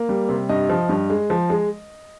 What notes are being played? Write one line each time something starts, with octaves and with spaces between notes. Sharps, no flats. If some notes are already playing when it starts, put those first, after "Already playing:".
Already playing: A#3
G3
C3
G2 D#5
F3
G2
G#3
F3
G#3